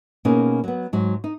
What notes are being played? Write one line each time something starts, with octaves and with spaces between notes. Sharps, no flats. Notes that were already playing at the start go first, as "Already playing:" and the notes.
B2 A#3 C#4 D#4 G#4
F#3 B3
G#2 F#3
D#4